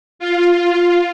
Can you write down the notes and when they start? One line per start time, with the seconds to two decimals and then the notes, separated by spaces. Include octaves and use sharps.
0.19 F4